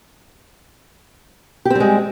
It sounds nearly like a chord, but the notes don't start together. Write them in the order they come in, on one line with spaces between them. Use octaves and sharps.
G4 C4 G3 G#3